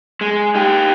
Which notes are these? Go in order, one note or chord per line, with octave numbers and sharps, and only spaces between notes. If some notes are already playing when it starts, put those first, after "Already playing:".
G#3
D#4 G4